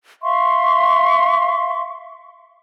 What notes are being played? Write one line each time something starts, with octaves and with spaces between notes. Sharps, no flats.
E5 F5 C6 C#6